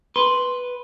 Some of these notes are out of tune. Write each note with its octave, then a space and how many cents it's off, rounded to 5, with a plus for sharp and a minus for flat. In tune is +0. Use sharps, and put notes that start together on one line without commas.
B4 +0 C6 +0